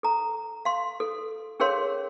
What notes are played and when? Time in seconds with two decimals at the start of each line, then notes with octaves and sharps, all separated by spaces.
0.03 A4 A#5
0.65 F5 C6
1.00 A4
1.60 C#4 G#4 A#4 C#5 F5 C6